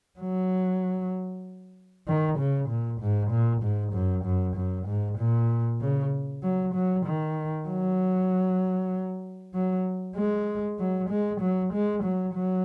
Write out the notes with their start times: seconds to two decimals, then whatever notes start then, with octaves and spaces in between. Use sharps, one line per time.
0.19 F#3
2.07 D#3
2.38 C#3
2.68 A#2
3.01 G#2
3.31 A#2
3.62 G#2
3.93 F#2
4.24 F#2
4.56 F#2
4.87 G#2
5.18 A#2
5.80 C#3
6.43 F#3
6.74 F#3
7.06 D#3
7.68 F#3
9.54 F#3
10.16 G#3
10.79 F#3
11.09 G#3
11.40 F#3
11.73 G#3
12.03 F#3
12.34 F#3